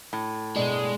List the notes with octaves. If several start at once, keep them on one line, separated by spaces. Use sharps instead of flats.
A2
G2 B2 G#3 D5